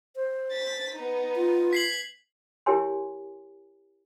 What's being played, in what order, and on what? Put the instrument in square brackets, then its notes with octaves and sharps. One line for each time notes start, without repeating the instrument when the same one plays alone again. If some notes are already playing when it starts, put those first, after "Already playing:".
[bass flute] C5
[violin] A6 B6
B3 D#4
[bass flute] F4
[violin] G#6 [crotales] B6 C7 F#7
[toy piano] E4 G4 A#4 C#5 G#5 C6